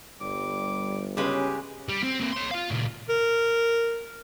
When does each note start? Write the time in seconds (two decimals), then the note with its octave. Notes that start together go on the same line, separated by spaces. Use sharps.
0.21 G1 G3 D6
1.17 C#3 G#3 C#4 G4 B4
1.89 G3
2.03 C4
2.20 A#3 C4
2.32 C#5 C6
2.51 F4 F5
2.70 A#2 C#3
3.09 A#4